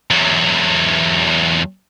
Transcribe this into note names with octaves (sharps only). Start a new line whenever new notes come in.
E2 F#3